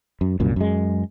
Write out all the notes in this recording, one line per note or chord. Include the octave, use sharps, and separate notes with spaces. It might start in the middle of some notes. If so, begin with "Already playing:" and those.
F#2
C2 F#2 A#2
F#2 G#3